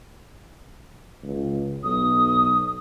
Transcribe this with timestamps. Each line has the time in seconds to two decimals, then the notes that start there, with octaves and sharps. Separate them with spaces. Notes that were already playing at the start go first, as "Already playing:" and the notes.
1.23 C#2
1.83 B1 D#6